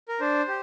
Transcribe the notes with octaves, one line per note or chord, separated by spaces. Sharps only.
A#4
D4 C5
G4